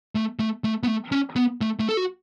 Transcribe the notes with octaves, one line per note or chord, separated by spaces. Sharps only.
A3
A3
A3
B3
A3
C#4
B3
A3
A3
A4
F#4